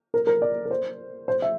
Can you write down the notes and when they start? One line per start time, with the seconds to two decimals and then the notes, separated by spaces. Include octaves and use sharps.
0.14 A#4
0.27 A#4
0.42 D5
0.65 A#4
0.71 C5
1.28 C5
1.42 E5